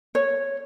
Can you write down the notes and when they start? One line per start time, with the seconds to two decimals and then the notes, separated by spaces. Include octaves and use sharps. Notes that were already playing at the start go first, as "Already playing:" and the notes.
0.15 C#5